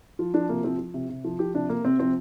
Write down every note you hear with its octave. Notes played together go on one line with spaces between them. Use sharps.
F3 F4
F3 D4
C3 A#3
F3 C4
F3
C3
C3
F3
F3 G4
C3 D4
C3 A#3
C3 C4
F3 C4